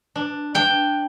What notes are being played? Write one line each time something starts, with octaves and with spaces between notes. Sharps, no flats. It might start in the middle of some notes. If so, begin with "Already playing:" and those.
D4
D4 G5